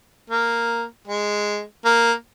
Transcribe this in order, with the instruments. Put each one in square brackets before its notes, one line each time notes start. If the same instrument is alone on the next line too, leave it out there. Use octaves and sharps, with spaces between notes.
[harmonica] A#3
G#3
A#3